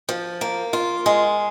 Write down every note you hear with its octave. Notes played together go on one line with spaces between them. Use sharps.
F3
A#3
F4
G#3